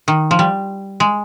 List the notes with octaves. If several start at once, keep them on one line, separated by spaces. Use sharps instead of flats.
D#3
F3
G3
G#3